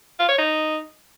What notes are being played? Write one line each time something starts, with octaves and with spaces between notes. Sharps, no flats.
F4
C#5
D#4